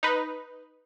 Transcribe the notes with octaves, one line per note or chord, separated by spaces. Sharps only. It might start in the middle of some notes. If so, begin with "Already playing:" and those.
D#4 B4